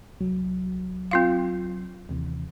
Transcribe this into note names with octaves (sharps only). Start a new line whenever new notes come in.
C2 F#3
C4 F4 F5
D#2 C3 E3